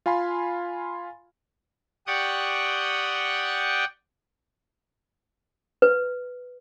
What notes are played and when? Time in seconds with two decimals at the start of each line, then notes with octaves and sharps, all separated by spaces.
0.06 F4 F5 G#5 B5 C6
2.07 G4 D5 F#5 G5 C#6 D#6
5.82 B4